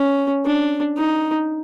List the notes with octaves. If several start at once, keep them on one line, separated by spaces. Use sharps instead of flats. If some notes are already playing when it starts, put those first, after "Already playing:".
Already playing: C#4
D4
D#4